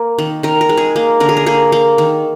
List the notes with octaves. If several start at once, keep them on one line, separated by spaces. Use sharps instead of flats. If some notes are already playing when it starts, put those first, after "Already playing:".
Already playing: A#3
D#3
D#3 A#4
A#4
G#3
G#4
A#3
D3 A#4
G#4
A#4
A#3 G#4
A#3
D#3